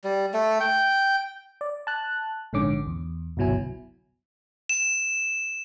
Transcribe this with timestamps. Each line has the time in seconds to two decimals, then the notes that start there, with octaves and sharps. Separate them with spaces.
0.04 G3
0.34 A3
0.60 G5
1.61 D5
1.87 A5 F#6
2.53 A#1 G#2 D3 C#4 D6
2.87 E2
3.37 G1 C2 B2 F#3 E4 G#5
4.69 E7